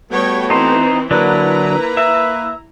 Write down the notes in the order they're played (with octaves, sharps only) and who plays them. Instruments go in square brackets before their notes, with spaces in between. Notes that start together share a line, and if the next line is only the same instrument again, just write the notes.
[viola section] G3 C#5 G5 [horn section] A3 B3 F#4
[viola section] E3 C4 [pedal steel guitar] D#4 C5
[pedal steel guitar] D3 F#3 D4 [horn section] A#3 B4 [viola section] E4 A#5
[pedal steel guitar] E5